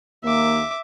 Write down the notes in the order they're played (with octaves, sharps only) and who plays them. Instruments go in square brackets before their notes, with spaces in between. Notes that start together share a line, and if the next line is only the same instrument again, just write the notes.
[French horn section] D#2 A#3 [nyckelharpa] E5 D6